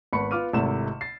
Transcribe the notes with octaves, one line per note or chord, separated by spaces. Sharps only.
G#1 B3 B5 C#6 C#7
B3 F4 D6 F6 D#7
G#1 C3 A3 E4 E7
A6 C7